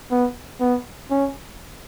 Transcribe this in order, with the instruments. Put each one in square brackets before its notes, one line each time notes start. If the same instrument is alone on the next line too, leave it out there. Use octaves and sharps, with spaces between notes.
[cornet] B3
B3
C#4